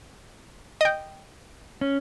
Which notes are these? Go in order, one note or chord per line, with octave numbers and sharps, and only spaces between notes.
D#5 G5
C#4